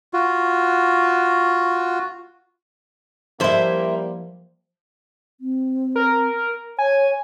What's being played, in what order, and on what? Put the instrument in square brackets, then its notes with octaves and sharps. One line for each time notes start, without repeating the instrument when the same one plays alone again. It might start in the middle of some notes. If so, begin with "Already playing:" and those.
[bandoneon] F4 F#4
[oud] F3 E5 [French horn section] G3 A#3 [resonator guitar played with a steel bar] E4 C5
[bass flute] C4
[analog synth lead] A#4
[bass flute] C#5 [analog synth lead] G#5